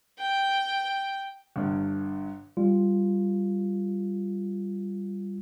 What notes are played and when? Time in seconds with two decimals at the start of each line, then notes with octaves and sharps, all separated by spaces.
0.19 G5
1.56 G1 G2
2.57 G3 F4